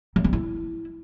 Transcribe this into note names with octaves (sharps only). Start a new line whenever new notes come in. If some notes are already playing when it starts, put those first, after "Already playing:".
F#3
G3
E4